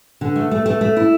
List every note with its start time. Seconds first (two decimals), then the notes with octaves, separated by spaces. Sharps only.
0.21 D3
0.36 A3
0.51 A3
0.66 A3
0.81 A3
0.97 E4